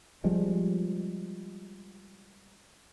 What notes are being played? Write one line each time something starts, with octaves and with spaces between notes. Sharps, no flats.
F3 G3 G#3 C4